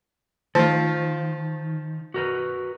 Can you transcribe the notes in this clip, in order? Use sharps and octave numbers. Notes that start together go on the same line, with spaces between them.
D#3 F3 F4
F#4 A#4 B4